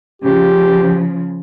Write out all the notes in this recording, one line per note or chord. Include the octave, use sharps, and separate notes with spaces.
C#3 F3 G4